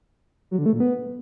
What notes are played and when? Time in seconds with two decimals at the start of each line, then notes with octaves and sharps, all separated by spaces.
0.51 F#3
0.58 D3
0.66 A3
0.73 A#2
0.80 B3